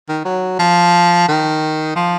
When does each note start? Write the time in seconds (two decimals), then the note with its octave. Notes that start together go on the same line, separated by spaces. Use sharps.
0.09 D#3
0.25 F#3
0.59 F3
1.28 D#3
1.96 F3